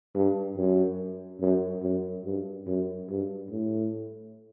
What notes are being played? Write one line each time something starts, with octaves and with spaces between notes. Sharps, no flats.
G2
F#2
F#2
F#2
G2
F#2
G2
A2